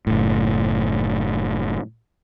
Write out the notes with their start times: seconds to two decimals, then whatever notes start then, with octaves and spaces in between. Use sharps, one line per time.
0.07 F#1 A2